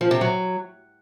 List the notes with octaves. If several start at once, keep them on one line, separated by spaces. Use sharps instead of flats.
F3
C3
F#3